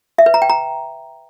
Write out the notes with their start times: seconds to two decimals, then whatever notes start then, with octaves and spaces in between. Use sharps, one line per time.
0.18 E5
0.26 B4
0.34 A#5
0.42 G5
0.49 A#5